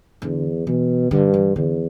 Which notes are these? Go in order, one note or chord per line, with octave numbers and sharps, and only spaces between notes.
E2 D3
B2 E3
G2 D3
E3
E2 D3